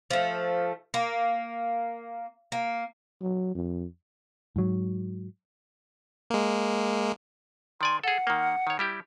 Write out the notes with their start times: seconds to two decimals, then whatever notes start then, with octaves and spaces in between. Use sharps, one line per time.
0.10 F3 A3
0.94 A#3
2.52 A#3
3.21 F#3
3.55 F2
4.56 G#2 F#3
6.30 G#3 A#3
7.81 D#3 D5 G#5 C6
8.04 G#4 A4 F#5
8.27 D#3 A#3
8.67 D#3 C#5
8.79 G3 E4 G4